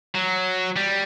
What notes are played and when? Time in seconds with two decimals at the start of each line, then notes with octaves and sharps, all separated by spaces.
0.15 F#3
0.76 G3